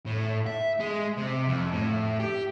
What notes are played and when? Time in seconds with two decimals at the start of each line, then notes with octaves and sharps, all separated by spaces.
0.06 A2
0.47 E5
0.80 G#3
1.17 C3
1.48 F2
1.72 A2
2.20 G4